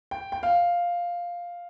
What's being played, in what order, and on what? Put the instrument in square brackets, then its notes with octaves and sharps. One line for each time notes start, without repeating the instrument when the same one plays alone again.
[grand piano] G5
G5
F5